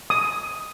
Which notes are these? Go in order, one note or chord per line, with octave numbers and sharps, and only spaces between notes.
D#6